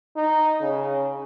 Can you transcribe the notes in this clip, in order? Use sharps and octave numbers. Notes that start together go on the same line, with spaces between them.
D#4
C#3